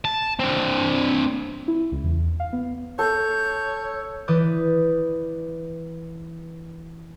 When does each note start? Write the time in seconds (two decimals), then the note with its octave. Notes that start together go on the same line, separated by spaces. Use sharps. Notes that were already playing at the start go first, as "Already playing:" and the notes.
0.05 A5
0.39 C4 D4
1.68 E4
1.92 C#2
2.04 E2
2.40 F5
2.53 B3
2.99 A4 C#5 G6
4.28 E3 B4 D5 D#6 G6